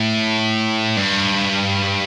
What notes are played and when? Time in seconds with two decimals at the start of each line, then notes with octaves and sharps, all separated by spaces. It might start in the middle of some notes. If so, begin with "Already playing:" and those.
Already playing: A2
0.97 G2